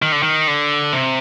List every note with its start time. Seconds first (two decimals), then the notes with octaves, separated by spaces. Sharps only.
0.02 D#3
0.12 D3
0.23 D#3
0.48 D3
0.93 C3